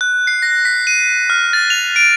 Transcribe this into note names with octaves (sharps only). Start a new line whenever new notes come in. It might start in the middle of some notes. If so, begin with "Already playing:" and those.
F#6
C7
A#6
B6
D#7
F6
A6
F7
D7